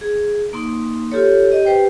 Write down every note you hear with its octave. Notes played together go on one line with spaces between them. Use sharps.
G#4
A#3 D#4 C6
F4 G4 A4 C#5
G4 D#5
G4 B4 C5 G5